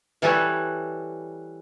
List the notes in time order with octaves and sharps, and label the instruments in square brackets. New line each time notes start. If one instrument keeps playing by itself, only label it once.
[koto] E3 G3 A4 B4 C#5